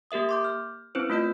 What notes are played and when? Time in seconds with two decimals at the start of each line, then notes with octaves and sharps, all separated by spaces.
0.11 A#3 G4 A#4 E5 D#6
0.29 C6 D6 G6
0.44 F6
0.95 C4 C#4 E4 B4 C5
1.10 A3 F4 D#5 G6